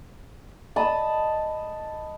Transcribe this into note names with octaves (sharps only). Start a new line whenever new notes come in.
D#5 A5 B5 D#6